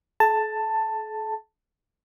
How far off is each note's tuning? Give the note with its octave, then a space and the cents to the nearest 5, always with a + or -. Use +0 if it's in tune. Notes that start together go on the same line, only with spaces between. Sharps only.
A4 -45 A5 +10